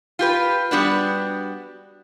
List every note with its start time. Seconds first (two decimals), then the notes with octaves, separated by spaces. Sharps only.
0.19 F4 G4 B4
0.71 G3 B3 D4 F#4